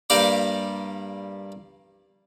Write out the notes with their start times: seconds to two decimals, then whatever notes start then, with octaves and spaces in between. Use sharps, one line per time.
0.10 G2 G3 A#3 G4 D5 D6